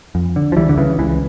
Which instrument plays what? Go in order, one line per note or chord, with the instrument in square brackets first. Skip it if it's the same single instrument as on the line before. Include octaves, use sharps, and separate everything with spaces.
[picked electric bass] F2
D3
F3
C#2 E3 G3
D3
C#3 E3
C#2 E3